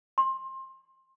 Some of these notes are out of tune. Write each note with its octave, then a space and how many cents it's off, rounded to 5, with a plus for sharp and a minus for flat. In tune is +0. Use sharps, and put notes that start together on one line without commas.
C6 +20